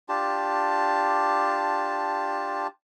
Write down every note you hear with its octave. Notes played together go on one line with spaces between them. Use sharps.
D4 F4 G4 A5